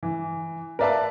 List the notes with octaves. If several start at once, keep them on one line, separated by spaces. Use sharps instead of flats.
E3
A#4 B4 D5 E5 F5 A5